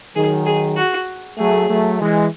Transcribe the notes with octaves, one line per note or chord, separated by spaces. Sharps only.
D#3 F#3 G#4
G#4
F#4
F#3 A3 G#4
F#3 A3
E3 G#3